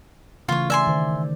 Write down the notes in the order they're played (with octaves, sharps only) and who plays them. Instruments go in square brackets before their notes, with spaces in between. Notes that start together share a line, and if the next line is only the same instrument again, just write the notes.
[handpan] C#3 E3 A3 [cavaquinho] F4 C#5
[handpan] D5 [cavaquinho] E5 G#5 C6
[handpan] D#3 C5